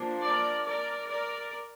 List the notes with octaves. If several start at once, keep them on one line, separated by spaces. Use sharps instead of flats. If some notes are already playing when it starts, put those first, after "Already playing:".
Already playing: F3 A#3 D4
A#4 D5
A#4 D5
A#4 D5